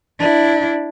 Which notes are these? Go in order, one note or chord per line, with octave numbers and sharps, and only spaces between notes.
D4 E4